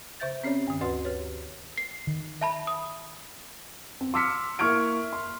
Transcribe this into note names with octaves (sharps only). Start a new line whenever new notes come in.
C#3 C5 E5 G6 A6
C4 C#4 G4 C#5 D5
G2 D#3
D2 F#4 B4 D5 F#5 C6
G4 B4 C#5
C7
D#3
E5 A5 B5
D#6
C4
C6 D6 E6 F6 B6 C#7
A#3 E4 C#6 F6 G#6 D7
C6